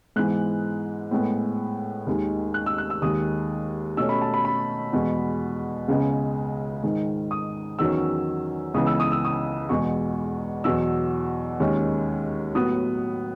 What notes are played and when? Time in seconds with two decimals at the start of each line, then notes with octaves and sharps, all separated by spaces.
0.16 G#2 E3 G#3 B3 F#6
1.11 A2 G#3 B3
2.07 D#2 D#3 G#3
2.54 F#6
2.66 E6
2.78 F#6
2.90 E6
3.02 D#2 D#3 G#3 D#6
3.97 B2 A3 C#4 E6
4.09 B5
4.22 A5
4.34 B5
4.45 B5
4.93 E2 B2 G#3
5.88 C#2 C#3 G#3 B3
6.83 G#2 D#3 G#3
7.31 D#6
7.79 E2 D#3 F#3 C#4 E6
8.74 C#2 C#3 E3 B3 D#6
8.87 E6
9.00 D#6
9.12 E6
9.25 D#6
9.69 E2 B2 G#3 C#6
10.64 E2 B2 F#3 B3 E6
11.60 D#2 D#3 G#3 C#4
12.55 A2 F#3 B3 D#6